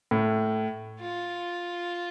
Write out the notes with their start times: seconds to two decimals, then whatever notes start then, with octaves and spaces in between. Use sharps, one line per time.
0.11 A2
1.01 F4